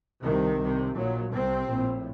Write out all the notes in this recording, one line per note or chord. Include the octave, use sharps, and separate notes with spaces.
C2 C3 D#3
C2 C3
A#1 A#2 F#3
C2 C3 C4
A#1 A2